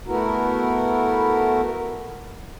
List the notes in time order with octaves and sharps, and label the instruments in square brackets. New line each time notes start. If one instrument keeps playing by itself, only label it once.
[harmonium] A3 B3 E4 F#4 A#4